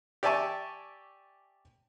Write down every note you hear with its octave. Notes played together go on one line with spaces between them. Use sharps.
G4 D5 E5 G#5 A5 C#6